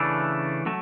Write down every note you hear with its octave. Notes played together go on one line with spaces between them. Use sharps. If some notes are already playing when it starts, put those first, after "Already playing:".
Already playing: C#3 E3 A3 D4
F#3 A3